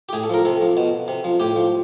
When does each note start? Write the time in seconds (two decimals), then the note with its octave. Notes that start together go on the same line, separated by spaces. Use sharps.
0.09 G4
0.13 A2 G#4
0.24 A4
0.30 F3 A#4
0.45 C3 A4
0.61 F3
0.77 B2
1.08 C3
1.24 F3
1.40 A2 G4
1.56 F3